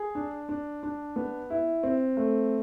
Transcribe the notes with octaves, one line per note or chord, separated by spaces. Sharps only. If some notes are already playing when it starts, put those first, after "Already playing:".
Already playing: G#4
D4
D4
D4
B3
E4
C4
A3